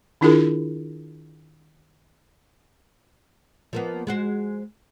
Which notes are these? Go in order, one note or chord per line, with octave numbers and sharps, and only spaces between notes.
D#3 D4 E4 F4 G#4 A#4
F3 A#3 B3
G#3 F#4 C5